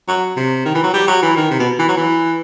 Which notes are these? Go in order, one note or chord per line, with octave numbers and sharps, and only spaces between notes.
F#3
C3
D#3
E3
F#3
G3
F#3
E3
D#3
C3
B2
E3
F#3
E3